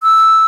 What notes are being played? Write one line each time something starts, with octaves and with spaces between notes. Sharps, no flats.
E6